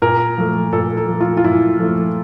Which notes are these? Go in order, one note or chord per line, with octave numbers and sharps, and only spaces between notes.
A#2 A#4
F3 A3
A#2 A4
A4
F3 A3
F4
F4
A#2 E4
F3 A3